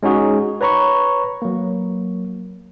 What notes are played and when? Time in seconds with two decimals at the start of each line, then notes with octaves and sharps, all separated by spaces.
0.03 G#3 C#4 D#4 F#4 G#4
0.61 B4 C#5 A#5 B5 C#6
1.42 F#3 A#3